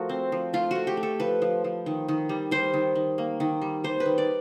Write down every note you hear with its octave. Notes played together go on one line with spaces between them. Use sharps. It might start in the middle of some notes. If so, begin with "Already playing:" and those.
Already playing: F3 A3 F#4 A#4
C4
F3
A3 F4
A3 F#4
G4
A3
A4
F3 B4
F3
F3
D#3
D#3
G3
G3 C5
D#3
D#3
A#3
D#3
G3
G3 C5
B4
D#3
D5